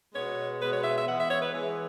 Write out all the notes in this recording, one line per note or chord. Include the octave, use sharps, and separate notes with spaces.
B2 G#3 B3 C#5
B2 G#3 B3 B4
C#5
E5
E5
E3 G#3 B3 F#5
E5
C#5
B4
E3 G#3 B3 G#4